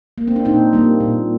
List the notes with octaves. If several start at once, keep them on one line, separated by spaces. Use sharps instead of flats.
A#3
C4
D4
A#2 C4 D#4
G3 A#3
A#2